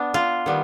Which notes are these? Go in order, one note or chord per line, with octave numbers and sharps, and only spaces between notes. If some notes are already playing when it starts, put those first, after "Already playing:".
Already playing: B3 D4
F4
D#3 G3 B3